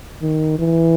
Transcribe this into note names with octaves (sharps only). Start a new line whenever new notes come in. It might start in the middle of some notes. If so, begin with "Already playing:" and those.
D#3
E3